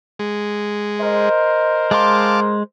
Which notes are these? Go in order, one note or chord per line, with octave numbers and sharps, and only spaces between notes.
G#3
A#4 C5 D#5
G#3 F5 A5 C6 D6